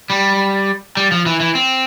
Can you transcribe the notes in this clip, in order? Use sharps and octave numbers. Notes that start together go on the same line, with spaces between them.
G3
G3
F3
E3
E3
C4